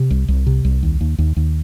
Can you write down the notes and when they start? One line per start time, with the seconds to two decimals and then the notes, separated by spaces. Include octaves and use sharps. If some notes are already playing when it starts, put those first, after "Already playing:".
Already playing: C3
0.11 C2
0.28 C2
0.47 C3
0.65 C2
0.83 D#2
1.01 D#2
1.18 D#2
1.36 D#2